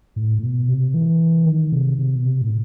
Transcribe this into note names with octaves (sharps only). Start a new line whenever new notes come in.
A2
A2
B2
C3
E3
D#3
C3
C3
B2
C3
A2